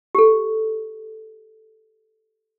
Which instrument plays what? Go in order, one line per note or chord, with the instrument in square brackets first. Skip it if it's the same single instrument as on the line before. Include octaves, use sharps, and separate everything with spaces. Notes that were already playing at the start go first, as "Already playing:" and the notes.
[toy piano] G4 A4